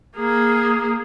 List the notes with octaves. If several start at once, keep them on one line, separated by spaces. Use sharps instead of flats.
A#3 G#4